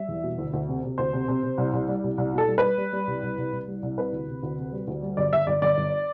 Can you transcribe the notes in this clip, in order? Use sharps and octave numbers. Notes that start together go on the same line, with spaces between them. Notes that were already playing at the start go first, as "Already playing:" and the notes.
Already playing: G3 E5
E2
B2
D2
D2
C3
C3
D2 C5
C3
C3
C3
C2
C2
G3
C2
C2
B2 A4
G3
B4
G3
G3
G3
C2
C2
C2
C2
G3
C2
C3 B4
D2
C3
D2
C3
G3
D2
G3
G1 D5
G1 E5
G1 D5
G1 D5
G1